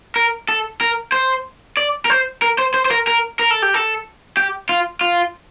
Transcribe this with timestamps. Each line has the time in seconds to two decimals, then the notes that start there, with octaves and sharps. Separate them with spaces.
0.16 A#4
0.49 A4
0.81 A#4
1.12 C5
1.77 D5
2.05 A#4
2.10 C5
2.42 A#4
2.59 C5
2.74 C5
2.85 C5
2.91 A#4
3.07 A#4
3.39 A#4
3.51 A4
3.62 G4
3.74 A4
4.37 G4
4.69 F4
5.01 F4